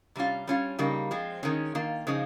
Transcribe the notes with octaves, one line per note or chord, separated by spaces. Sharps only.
C3 G3 C#4 F4
G3 C#4 F4
C#3 G3 A#3 D#4
F3 G#3 C4
D#3 G#3 C#4
D#3 A#3 F4
C#3 F3 G#3 D#4